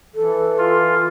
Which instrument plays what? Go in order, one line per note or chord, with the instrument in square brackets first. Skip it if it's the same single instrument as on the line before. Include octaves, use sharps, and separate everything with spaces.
[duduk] E3 [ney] A4
[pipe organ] F4